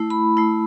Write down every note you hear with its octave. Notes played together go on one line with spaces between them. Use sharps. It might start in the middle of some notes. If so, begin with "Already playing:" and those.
Already playing: A3 E4
B5
A3 E4